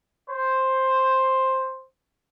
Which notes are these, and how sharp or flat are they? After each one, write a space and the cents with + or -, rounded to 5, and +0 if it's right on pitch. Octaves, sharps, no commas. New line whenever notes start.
C5 +5